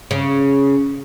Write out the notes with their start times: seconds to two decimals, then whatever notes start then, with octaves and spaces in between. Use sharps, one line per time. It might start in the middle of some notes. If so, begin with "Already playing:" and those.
0.11 C#3